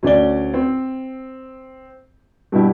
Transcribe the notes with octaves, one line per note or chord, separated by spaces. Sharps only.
D2 C#4 D5 G7
C4
G2 B2 E4 G4